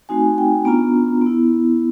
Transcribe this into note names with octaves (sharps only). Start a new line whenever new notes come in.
A3 C4 D#4 F#4 G#5
G5
B3 D4 F4 A#5
B3 E4